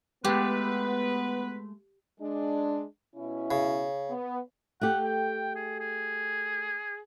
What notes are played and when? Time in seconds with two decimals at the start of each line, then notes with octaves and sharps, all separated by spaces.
0.24 G#3 A3 B3 G4 B4
2.21 G#3 D4
3.15 B2 C#4 E4
3.51 C#3
4.09 B3
4.81 A3 G4 F#5
5.05 G5
5.55 G#4
5.80 G#4